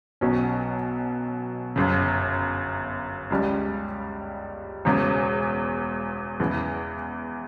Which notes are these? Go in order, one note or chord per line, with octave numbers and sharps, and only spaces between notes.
B1 B2 F#3 C#4
G1 F#2 C#3
C#2 C#3 G3 C#4
E1 E2 C#3
E2 C#3 E3